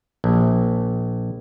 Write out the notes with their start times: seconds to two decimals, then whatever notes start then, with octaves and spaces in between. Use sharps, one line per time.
0.24 A#1